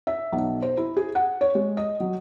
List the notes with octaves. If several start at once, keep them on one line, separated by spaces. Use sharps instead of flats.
E5
B1
C5
E4
G#4
F#5
C#5
G#3
D#5
F#3